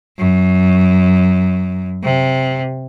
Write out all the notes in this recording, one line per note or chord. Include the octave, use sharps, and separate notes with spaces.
F#2
C3